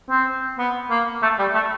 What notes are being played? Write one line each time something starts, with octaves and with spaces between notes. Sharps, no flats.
C4
B3
A#3
A3
G3
A3